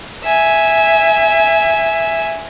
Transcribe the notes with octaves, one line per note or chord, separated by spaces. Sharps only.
E5 G#5